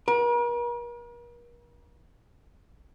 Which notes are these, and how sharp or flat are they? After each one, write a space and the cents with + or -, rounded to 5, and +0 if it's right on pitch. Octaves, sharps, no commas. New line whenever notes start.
A#4 +45